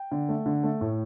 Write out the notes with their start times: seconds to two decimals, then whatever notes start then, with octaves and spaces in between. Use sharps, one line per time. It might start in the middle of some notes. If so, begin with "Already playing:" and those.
Already playing: G5
0.12 D3
0.29 A3
0.46 D3
0.63 A3
0.81 A2